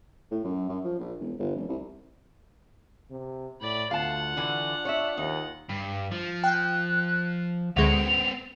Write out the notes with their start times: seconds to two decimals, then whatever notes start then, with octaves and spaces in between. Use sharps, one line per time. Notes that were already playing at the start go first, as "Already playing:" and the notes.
0.31 A2
0.44 F#2
0.69 F#2
0.84 F3
0.99 A#1
1.20 E1
1.39 G1
1.55 F1
1.68 C2
3.10 C3
3.61 A2 D5 B5
3.91 D2 F4 F5 F#5 A5
4.37 D3 E3 D4 F#4
4.85 C#5 D#5 E5
5.17 D#2 D#4
5.69 G2
6.12 F3
6.44 G5 F#6
7.76 D2 G#3 B3 C4 C#7 F7